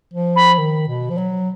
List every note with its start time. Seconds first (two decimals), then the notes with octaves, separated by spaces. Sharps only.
0.13 F3
0.36 B5
0.58 D#3
0.88 B2
1.10 F3
1.18 F#3